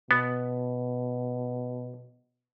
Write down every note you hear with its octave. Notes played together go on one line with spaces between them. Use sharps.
B2 B3